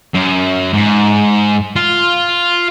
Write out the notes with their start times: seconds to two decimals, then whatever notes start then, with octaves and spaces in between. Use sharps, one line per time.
0.14 F#2
0.73 G#2
1.76 F4